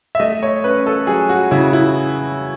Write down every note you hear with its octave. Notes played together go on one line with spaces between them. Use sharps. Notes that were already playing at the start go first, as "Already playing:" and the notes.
E5
A3 D#5
C#5
C#4 B4
A4
F#3 G#4
F#4
C#3 E4
E4